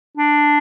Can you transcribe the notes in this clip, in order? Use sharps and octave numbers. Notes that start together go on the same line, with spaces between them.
D4